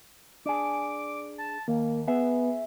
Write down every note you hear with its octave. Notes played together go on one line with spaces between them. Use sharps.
D4 G#4 D6
A5
D#2 A#3
B3 G#4 E5